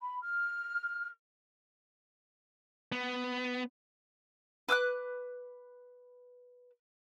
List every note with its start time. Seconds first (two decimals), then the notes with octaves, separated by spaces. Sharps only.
0.01 B5
0.22 F6
2.92 B3
4.69 B4 D6 E6 F#6